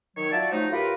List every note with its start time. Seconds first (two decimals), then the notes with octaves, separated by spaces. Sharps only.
0.17 D#3 F#3 C#5
0.31 F4 F#4 D5 E5 A5
0.52 F3 F#3 A3 D#4
0.72 A2 F4 G4 A#4 B4